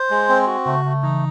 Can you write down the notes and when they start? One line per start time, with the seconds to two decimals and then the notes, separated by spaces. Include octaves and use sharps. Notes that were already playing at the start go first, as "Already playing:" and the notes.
Already playing: C5
0.10 G#3
0.29 C4
0.47 F#4
0.66 C#3 A3
0.85 C#3 A3
1.03 C#3 E3 D#4